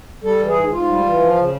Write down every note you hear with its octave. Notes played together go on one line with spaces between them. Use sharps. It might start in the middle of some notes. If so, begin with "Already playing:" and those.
G3 A4
E3
G#4
G#2
G#2 F4
G3
E3
F3
C#3